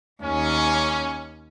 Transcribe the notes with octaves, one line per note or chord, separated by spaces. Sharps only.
D#2 C#4